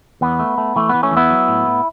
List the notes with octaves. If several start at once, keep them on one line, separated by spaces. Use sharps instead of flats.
E2 B3
A3
A3
E3 A3
E3 B3
A3 C#4
E2
B3 E4
F#3
A2
A2